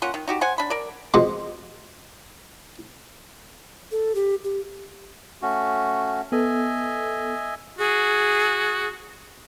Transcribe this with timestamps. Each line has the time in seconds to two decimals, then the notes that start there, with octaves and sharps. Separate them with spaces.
0.02 A#3 C#4 F4 F#5
0.14 D#3
0.28 D#4 F#4 G4
0.41 C5 F#5 G#5
0.58 D4 B5
0.70 A#4 D5
1.14 F2 B2 G#3 F#5 C6
3.92 A4
4.15 G4
4.44 G4
5.42 A3 C#4 F#4
6.32 B3 A4 D#5 E5 G#5
7.79 F#4 G#4